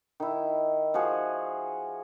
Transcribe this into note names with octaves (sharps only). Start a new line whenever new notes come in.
D#3 E4
F3 F4 F#4 G#4